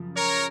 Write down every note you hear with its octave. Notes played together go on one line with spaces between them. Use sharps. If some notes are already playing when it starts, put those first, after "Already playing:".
Already playing: F#2 C#3 F3
A#4 C#5